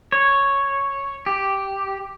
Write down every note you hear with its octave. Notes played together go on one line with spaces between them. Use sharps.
C#5
G4